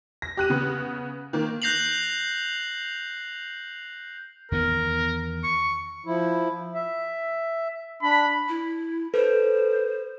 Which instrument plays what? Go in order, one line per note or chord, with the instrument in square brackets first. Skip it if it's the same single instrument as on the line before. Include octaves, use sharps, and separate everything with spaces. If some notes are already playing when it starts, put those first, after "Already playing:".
[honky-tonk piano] A#6
G4 F#6 D#7
C#3 B3
D#3 A#3
[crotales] F#6 G6 A#6 C7 F7 F#7
[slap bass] E2 D#3 B3 [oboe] A#4
[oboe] C#6
[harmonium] F3 E4
E5
[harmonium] D4 [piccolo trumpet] B5
[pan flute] E4
[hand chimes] A4 B4 [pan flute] C5